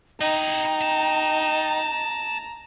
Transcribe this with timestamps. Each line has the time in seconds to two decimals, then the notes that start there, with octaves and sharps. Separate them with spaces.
0.21 D#4 E4 D#5 G5 A#5
0.82 A5